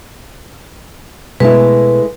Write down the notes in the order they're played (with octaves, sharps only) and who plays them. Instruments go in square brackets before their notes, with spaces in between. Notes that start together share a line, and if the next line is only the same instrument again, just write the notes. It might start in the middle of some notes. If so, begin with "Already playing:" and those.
[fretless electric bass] B2 [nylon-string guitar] G#3 A3 E4 [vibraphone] B4